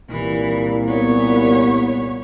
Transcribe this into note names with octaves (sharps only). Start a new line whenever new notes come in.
C2 A#2 E3
B3 C#5